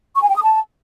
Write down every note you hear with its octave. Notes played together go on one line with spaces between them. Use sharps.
C#6
G#5
G5
D#6
A5